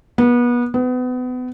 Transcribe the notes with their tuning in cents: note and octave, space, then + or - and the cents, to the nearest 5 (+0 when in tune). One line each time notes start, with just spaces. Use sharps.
B3 -30
B3 +30